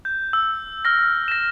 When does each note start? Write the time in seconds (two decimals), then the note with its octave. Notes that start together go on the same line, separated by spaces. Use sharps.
0.05 G6
0.33 E6
0.85 F6 A#6
1.28 A#6 E7